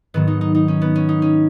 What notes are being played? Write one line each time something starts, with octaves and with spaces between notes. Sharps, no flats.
G#2 D#3 F#3 B3
D#4
D#4
D#4
C#4
B3
C#4
D#4
C#4